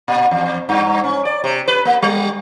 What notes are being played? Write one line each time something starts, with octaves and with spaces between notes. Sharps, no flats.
A#2
E2
G2
C#4
D5
C3
B4
A#3
G3